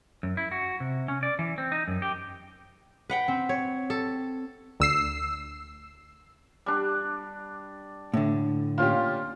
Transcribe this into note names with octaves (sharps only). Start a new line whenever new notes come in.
F#2
E4
F#4
C3
C#4
D5
E3
C4
D#4
F#2
G4
B4 F#5 G5
C4
C#5
A4
D2 E6 C7
G3 D4
A2 D3
A#2 C#4 F4 G4